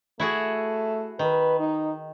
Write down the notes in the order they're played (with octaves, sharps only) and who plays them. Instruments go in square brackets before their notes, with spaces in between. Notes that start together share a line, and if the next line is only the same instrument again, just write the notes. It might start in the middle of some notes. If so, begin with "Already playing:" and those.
[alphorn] A3 [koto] E4 F#4 G#4
[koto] D#3 [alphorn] B4
[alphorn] D#4